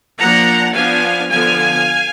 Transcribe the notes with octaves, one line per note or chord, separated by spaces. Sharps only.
F3 A#3 D4 F#5 A#5
F3 B3 D4 F5 G#5
D3 F3 B3 F5 G#5